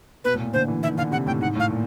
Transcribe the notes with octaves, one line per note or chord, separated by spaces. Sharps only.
B2 B4
A2
A#2
D3 C5
E3
D#3 E5
D3 F5
C3 F#5
A2 G5
G#2 F#5
A2 F5
A#2